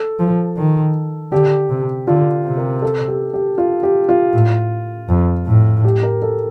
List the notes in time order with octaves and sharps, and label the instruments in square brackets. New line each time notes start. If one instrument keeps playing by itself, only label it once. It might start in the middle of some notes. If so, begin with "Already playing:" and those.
Already playing: [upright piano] A4
[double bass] F3
D#3
[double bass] D3 [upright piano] G4
[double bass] C3
[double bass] D3 [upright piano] F4
[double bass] C3
[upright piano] A#4
A4
G4
G4
F4
G4
F4
[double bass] A2
F2
A2
[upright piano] G4
A#4
A4